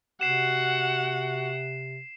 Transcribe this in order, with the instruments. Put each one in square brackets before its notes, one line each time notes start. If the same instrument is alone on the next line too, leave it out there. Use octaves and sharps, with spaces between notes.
[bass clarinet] C3 [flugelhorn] F#4 [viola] F#5 [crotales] C7 E7